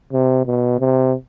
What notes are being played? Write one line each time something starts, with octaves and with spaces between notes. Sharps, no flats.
C3
B2
C3